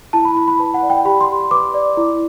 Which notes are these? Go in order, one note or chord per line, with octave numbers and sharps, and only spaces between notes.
E4 A5
B5
E4 B5
B5
B4 A5
F#5
D5
G5
G4 B5
C6
G4
B4 D6
D5
E4